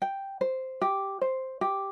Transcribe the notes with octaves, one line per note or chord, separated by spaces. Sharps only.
G5
C5
G4
C5
G4